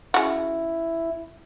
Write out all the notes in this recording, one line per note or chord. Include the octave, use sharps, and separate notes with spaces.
C#3 E4 F#4